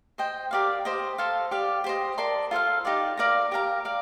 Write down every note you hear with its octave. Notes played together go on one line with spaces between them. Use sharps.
C5 D#5 G5
G4 A#4 D5 F5
G4 C5 D#5
A4 C5 F5 A5
G4 D5 F5
G4 C5 D#5
A#4 D5 A5 C6
F4 A4 C5 F5
D#4 G4 D5 F5
A#4 D5 F5 A#5
G4 A#4 F5 A#5
D5 F5